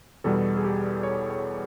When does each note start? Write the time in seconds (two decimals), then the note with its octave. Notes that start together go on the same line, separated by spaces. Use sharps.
0.24 E2 B2 G3 A4
0.57 G#4
0.64 G4
1.03 C#5
1.30 C#5